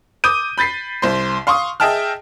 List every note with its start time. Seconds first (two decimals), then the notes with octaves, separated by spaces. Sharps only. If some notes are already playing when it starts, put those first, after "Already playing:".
0.24 D6 D#6 G6 D#7
0.58 B5 G6 A6 B6 C7
1.02 C2 C5 C6
1.47 F5 C6 C#6 D#6
1.80 G#4 D#5 E5 G5 A5 F6